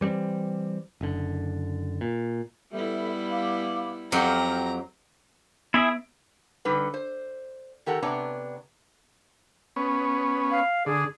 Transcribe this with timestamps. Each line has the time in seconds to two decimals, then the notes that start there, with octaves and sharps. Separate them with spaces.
0.01 E3 G3 A3 C4
1.01 F#1 D3
2.01 A#2
2.72 G3 B3 E4 A4 E5
3.30 F5 D6
4.12 F2 F#3 G4 G5 A#5 F6
5.74 B3 E4 G#4 E5 D7
6.65 D3 G3 D#4 B4
6.94 C5
7.86 D#3 G4 A4 A#4 F#5 A#5
8.02 C3 B3 D4 C#5 A#5
9.76 B3 C#4
10.51 F5
10.86 D3 G#4